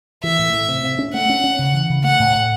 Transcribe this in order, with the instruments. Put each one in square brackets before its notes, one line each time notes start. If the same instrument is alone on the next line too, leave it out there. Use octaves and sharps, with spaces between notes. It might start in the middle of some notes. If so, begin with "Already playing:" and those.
[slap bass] E3 [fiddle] E5
[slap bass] A2
A2
C3
C3
C#4
[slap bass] A3 [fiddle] F#5
[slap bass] C#4
C#4
C#3
E3
C#3
[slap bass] A3 [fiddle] F#5
[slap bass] A2
A2